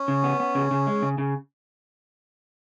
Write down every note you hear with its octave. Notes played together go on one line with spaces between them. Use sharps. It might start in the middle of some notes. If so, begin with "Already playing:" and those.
Already playing: C#4
C#3
B3
B3
C#3
C#3
G#3
C#3
C#3